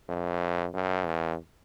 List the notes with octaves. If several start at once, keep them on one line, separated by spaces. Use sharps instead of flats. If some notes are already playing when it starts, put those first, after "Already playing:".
F2
F#2
E2